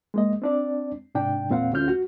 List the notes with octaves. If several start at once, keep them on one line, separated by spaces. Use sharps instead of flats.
G#3 A#3 D#5
C4 D4 D5
G#2 C3 D4 G5
E2 A#2 C4 F5 F#5
D2 A3 C#4 F4 F6 G6
F#4